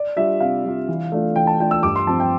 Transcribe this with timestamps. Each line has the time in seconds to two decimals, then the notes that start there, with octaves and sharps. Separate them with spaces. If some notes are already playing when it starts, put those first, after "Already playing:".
Already playing: D5
0.16 G3 D4 F4 E5
0.40 C3 F5
0.65 G3 D4 F4
0.88 E3
1.12 A3 D4 F4
1.36 E3 G5
1.47 A5
1.60 A3 D4 F4 G5
1.71 E6
1.83 G2 D6
1.96 C6
2.07 F3 C4 A5
2.20 G5